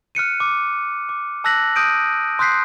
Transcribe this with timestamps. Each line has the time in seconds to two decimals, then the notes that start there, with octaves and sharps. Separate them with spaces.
0.15 F6 F#6 C#7 D#7
0.40 D6
1.09 D6
1.44 A5 E6 F#6 A#6 B6 F#7
1.76 D#6 G6 D7 D#7
2.39 C6 D#6 F#6 G6 B6 C7